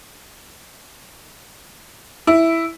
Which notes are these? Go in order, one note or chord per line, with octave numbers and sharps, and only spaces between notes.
E4